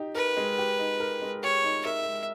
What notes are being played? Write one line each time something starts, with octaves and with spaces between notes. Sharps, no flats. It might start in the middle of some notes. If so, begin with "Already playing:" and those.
Already playing: D#4 G4
A#4 B4
G#3
G4
D#4
A#4
G#3
G4 C#5
D#4
A#4 E5
G#3